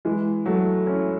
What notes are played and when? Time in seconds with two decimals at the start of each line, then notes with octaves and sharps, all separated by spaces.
0.05 E3 G#3
0.46 F#3 A3
0.87 C#4 E4